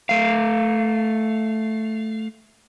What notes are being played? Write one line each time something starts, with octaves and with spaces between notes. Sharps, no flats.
A3 F5